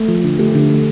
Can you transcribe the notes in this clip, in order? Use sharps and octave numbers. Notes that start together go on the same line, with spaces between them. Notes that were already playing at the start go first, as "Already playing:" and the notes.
Already playing: A3
F3
D3
A3 G4
D3
A3